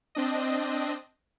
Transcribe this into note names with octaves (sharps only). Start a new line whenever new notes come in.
C4 D4 D#5